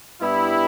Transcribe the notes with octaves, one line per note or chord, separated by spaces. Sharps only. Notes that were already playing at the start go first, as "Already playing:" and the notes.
G2 G3 B3 E4